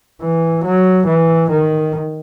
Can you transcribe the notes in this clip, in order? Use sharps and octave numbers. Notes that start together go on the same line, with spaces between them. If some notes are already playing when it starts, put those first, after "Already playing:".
E3
F#3
E3
D#3